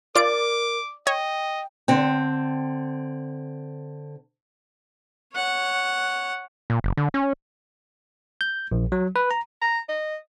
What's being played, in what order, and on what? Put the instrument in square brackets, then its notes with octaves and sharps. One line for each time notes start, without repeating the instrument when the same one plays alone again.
[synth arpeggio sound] F4 D7 [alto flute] A#4 [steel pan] D5 [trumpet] D6
[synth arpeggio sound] C#5 [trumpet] D#5 [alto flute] G5
[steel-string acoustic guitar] D3 C4
[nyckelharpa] C#5 F#5
[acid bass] A#2
F#1
D3
C#4
[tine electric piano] G6
A#1
F#3
B4
A#5
[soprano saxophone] A#5
D#5